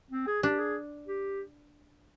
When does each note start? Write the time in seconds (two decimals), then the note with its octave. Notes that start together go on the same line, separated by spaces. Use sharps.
0.11 C4
0.27 G#4
0.43 D4 G4
0.59 G#4
1.08 G4